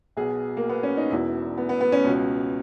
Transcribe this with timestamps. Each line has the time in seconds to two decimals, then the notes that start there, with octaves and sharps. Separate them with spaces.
0.17 B1 B2 G#4
0.57 A#3
0.69 B3
0.83 C#4
0.97 D#4
1.11 E1 E2 B2 E4
1.57 B3
1.69 B3
1.81 B3
1.92 C#4
2.04 C#2 B2